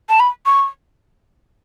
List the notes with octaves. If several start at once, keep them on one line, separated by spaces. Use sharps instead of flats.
A5
B5
C#6